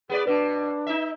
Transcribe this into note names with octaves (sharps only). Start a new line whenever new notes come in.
B3 G#4 B4 D5
B2 D4 B4
D#4 E5